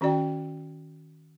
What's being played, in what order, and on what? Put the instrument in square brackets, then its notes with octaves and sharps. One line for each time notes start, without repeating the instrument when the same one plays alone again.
[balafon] D#3 C#4 F#4 D5 G5